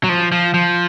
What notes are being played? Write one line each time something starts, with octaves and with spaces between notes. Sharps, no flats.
F#3
F3
F3
F3